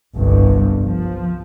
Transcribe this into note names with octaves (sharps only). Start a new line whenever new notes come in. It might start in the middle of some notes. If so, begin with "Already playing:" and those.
G1 C2 G2
F3